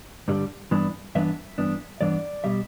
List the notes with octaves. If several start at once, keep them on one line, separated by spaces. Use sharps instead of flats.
G2 D3 G3
G2 E3 B3 D4
G2 E3 B3 D4 E5
G2 E3 B3 D4
G2 E3 B3 D4 D5
B2 G3 E5